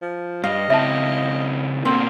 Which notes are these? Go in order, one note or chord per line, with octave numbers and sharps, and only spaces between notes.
F3
G2 D#5 F5
C#3 C4 E4 E5 A5
B2 D3 A#3 C4